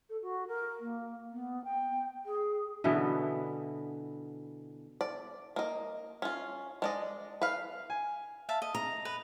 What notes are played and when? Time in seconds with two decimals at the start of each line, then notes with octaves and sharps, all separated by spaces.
0.09 A4
0.22 F#4
0.47 A#4
0.79 A#3
1.32 B3
1.64 G5
2.25 G#4
2.84 B2 D3 E3 B3
5.01 D5
5.56 A#3 D#5
6.22 C#4 F4
6.82 G#3 D5 D#5
7.42 B4 F5
7.90 G#5
8.49 E5 F5 A5
8.62 D#5
8.75 A#5
9.05 B4